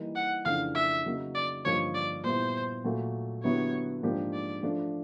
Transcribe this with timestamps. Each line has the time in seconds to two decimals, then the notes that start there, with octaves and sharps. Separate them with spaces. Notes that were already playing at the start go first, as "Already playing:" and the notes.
Already playing: E3 G3 A#3 D#4
0.16 F#5
0.45 F2 C#3 E3 A3 D4 F5
0.75 E5
1.05 C#3 F#3 A#3 D#4
1.35 D5
1.65 G2 D3 F3 A#3 D#4 C#5
1.95 D5
2.24 A#2 G3 B3 E4 C5
2.84 A#2 F#3 A3
3.43 D3 F#3 B3 E4 G4 C#5
4.03 G#2 F3 A#3 D4 G4
4.33 D5
4.63 F3 A3 D4